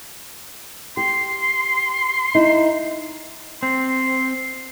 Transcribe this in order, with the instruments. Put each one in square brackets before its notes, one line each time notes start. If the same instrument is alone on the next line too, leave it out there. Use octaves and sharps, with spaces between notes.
[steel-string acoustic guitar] G4 [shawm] C6
[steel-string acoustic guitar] D#4 E4
[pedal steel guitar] C4 [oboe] C6